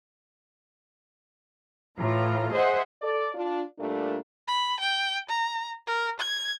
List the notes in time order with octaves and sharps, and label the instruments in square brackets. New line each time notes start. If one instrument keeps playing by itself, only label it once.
[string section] A2 E3 F4 A#5
G#4 C5 D#5 E5 F#5
[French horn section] A4 D5
D4 F4
A#2 G3 A3 D4 A#4
[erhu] B5
G5
A#5
A#4
G#6